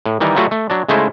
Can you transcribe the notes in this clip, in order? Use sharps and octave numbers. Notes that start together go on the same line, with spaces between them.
A2
D#3 E3 G3 D#4 A#4
F#3 G3 A3 F4 F#4
A3
F#3 D4
C#3 G#3 A3 D#4 E4 C5